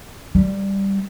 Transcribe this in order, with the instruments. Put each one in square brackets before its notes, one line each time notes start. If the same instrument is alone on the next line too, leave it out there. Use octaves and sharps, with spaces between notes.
[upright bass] G3